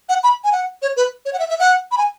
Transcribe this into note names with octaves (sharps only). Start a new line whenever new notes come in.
F#5
B5
G#5
F#5
C#5
B4
C#5
F#5
E5
E5
F#5
B5
G#5